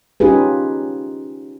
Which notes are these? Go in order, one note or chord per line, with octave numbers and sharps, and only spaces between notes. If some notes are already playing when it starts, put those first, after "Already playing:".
C#4 D#4 F4 G4 G#4 B4